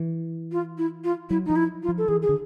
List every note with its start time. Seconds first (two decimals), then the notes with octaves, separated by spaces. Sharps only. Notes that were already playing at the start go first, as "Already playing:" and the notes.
Already playing: E3
0.52 F4
0.78 E4
1.04 F4
1.30 F#3 E4
1.46 F3 D#4
1.56 E4
1.83 F4
1.88 F3
1.98 A4
2.08 E3 G#4
2.22 G#4
2.29 D3